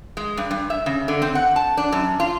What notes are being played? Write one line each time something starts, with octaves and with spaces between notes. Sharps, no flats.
G#3
G2
G2
E5
C#3
D3
C4
F#5
A5
D4
F#2
F4